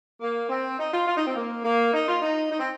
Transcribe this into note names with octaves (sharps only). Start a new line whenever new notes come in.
A#3
C4
D#4
F4
F4
D#4
C4
A#3
A#3
D#4
F4
D#4
D#4
C4